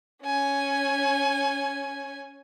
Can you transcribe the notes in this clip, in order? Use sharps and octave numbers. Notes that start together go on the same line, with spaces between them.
C#4 G#5